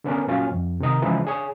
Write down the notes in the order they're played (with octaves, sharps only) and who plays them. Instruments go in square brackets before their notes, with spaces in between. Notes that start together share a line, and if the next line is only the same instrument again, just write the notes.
[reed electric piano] D3 B3 C#4 D4 A#4
A#2 F#3 C#4 F4 F5
F2
C3 D#3 D#5 A#5
C#3 E3 F3 G#3 D#4 E4
D4 G#4 C#5